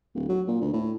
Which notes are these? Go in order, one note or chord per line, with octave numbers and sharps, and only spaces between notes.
D1
F#3
A#2
D2
A2